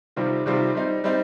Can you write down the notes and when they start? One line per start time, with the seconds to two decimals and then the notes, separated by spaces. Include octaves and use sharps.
0.16 C3 D#3 G3 C4 F4
0.46 C3 D#3 G3 C4 F4
0.75 G3 C4 D#4
1.04 G3 C4 D#4